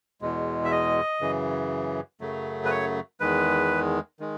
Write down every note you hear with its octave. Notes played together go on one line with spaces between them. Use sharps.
E2 B2 G#3
E5
D#5
F#2 C#3 E3
F#2 C#3 F#3 A3
B4
C#5
E2 D#3 G#3 B4
D#3 G#3